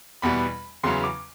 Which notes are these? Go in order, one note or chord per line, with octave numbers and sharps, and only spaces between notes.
E2 B2 G3 B3 B5
E2 C#3 F#3 B3 C6
D6